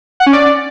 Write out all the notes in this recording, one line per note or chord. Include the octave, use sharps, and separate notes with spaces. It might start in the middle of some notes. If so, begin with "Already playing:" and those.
F#5
C#4
D5